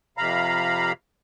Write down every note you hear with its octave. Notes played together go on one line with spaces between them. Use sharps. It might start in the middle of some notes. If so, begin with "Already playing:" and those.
F2 C3 F5 A#5 B5